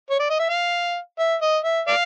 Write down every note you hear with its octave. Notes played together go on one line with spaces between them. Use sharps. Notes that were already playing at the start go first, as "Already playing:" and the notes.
C#5
D5
D#5
E5
F5
E5
D#5
E5
D5 F5